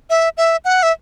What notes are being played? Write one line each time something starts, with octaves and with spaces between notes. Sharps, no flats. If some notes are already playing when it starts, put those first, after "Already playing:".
E5
E5
F#5
E5